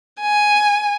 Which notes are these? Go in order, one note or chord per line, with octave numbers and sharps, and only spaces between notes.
G#5